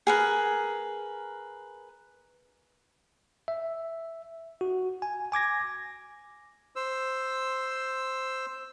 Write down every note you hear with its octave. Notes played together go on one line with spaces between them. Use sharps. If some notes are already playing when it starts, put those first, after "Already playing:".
G#4 A#4 B4
E5
F#4
G#5
G#5 D6 G#6 A#6
C5 E6